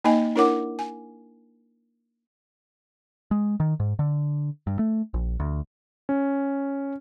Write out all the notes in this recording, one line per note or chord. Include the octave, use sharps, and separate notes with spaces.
A#3 D#4 D#5 G#5
D4 E4 A#4 C#5 F#5 D6
G#5
G#3
D#3
G#2
D3
G2
A3
A#1
D2
C#4